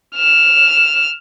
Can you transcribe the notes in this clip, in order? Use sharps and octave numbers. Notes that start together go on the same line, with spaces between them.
F6 E7